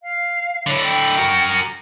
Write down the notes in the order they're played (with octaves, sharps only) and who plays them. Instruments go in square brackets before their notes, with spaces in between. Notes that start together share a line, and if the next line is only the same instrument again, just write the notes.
[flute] F5
[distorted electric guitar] D3 E4 [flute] C#5
[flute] G5
[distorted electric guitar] F#4 A#4